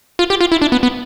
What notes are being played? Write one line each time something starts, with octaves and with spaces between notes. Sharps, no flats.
F4
G4
F4
E4
D4
B3
B3